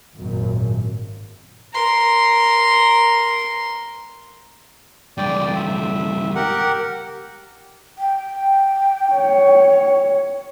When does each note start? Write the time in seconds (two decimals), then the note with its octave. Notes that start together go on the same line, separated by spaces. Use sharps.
0.16 G#1 F#2 A#2
1.73 A#4 C6
5.18 C#2 G2 D5 G5
5.55 E5
6.35 G4 A#4 F#5
7.98 G5
9.13 C#5